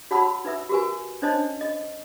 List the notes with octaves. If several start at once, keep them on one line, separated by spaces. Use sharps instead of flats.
F#4 C#5 F#5 A5 B5 E6
D#4 B4 E5 E6
F#4 G4 A#4 B4 G#5
C#4 D4 C5 C#5 D#5 A5
D#5